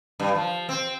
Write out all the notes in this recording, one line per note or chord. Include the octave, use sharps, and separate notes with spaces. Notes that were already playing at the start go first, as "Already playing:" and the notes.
G2
F3
C4